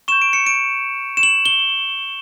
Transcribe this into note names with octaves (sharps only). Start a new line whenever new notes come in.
C#6 G6 E7
D7
C#7
D7
E7
F#7
G7